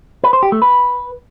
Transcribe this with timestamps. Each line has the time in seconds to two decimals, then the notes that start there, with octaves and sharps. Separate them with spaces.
0.24 B4
0.33 C5
0.43 G4
0.52 A3
0.62 B4